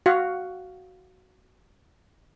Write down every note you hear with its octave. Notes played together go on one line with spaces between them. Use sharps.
F#4 F5